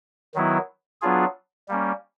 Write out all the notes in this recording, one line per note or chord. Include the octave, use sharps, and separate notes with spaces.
D#3 F#3 B3 E4
F#3 B3 D4 F4 G#4
G3 A#3 C#4